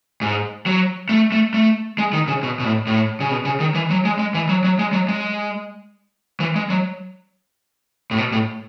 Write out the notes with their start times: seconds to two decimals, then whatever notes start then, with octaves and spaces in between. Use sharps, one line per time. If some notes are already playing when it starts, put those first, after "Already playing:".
0.21 G#2
0.66 F#3
1.09 A3
1.32 A3
1.54 A3
1.98 G#3
2.13 D#3
2.28 C#3
2.43 B2
2.59 B2
2.65 A2
2.87 A2
3.20 C#3
3.31 B2
3.45 C#3
3.60 D#3
3.75 E3
3.90 F#3
4.05 G#3
4.19 G#3
4.34 E3
4.49 F#3
4.64 F#3
4.79 G#3
4.93 F#3
5.08 G#3
6.40 E3
6.56 G#3
6.70 F#3
8.11 A2
8.18 B2
8.32 A2